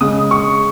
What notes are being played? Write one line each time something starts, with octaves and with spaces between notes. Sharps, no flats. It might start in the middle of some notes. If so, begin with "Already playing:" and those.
C#3 G#3 D#6
C#6